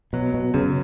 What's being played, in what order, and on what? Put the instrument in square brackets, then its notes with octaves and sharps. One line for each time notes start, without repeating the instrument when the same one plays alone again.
[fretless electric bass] B2 [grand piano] F#3
[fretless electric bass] B2
[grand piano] F#2 [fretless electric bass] C#3